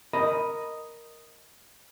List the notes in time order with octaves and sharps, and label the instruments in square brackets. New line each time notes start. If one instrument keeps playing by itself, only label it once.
[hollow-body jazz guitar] A#4 D#5 B5